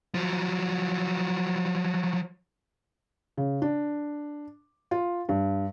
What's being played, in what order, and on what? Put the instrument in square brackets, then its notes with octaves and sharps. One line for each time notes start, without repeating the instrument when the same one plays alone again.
[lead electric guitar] F3 F#3
[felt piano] C#3
D4
F4
G2